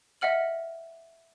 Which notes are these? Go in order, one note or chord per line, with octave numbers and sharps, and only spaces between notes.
D#5 E5 F#5 F6 F#7